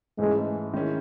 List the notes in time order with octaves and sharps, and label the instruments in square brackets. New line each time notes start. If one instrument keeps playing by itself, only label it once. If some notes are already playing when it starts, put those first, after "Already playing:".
[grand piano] G#2 E3 A3 C#4 [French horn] G#3
[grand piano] D#3 G#3 C#4 E4